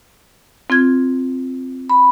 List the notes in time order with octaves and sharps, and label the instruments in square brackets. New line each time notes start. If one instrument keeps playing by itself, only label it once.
[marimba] C4 F4 G#6
[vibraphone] B5